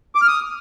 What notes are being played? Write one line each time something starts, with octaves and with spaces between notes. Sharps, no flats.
D6
F6
D#6